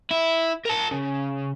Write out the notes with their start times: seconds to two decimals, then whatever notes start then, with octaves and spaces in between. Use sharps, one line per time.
0.11 E4
0.65 A#4 A5
0.92 C#3